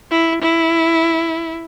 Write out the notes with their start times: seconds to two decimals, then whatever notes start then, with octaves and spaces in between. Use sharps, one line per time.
0.11 E4
0.42 E4